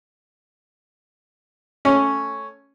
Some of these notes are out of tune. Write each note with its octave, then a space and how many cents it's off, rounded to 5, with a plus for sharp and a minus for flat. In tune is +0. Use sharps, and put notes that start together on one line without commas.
A3 +0 C#4 +0